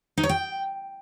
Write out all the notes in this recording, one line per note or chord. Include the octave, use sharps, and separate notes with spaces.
D#4
C#5
G5